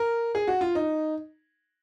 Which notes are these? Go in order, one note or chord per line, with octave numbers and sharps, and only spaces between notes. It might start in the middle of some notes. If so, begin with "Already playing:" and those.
Already playing: A#4
G#4
F#4
F4
D#4